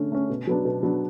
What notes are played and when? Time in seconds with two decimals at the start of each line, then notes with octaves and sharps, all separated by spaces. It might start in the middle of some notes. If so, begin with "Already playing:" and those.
Already playing: D3 A3 C#4
0.12 A3 C#4
0.30 B2
0.47 F#3 B3 D4
0.65 B2
0.83 F#3 B3 D4